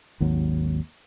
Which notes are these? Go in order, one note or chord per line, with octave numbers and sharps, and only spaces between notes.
G#1 D#2 F#3